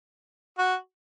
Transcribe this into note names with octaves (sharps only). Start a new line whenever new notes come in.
F#4